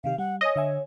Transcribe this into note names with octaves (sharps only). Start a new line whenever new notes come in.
C3 D#3 G4 F5
G3 F#5
C#5 D#5 G#5 D#6 E6
D3 E5 G#5